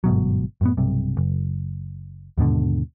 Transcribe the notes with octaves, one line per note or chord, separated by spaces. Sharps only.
G1 G#2 B2 F#3
F#2 A2 B3
B1 G2 C3
F#1
D#2 G#2 B2 D3